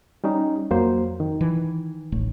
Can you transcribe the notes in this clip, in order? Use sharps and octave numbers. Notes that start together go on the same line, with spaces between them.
G3 C#4 D#4
F2 F#3 A#3 C5
D#3
E3
D1 A1 A3